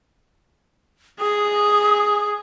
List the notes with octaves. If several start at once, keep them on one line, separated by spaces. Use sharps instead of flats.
G#4 D#6